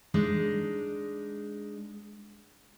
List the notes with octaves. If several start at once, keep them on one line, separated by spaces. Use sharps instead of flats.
G#3 D4 D#4